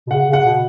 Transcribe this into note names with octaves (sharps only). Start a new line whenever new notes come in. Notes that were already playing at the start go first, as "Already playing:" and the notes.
B2
C#3 F#5
C#3
F#5
B2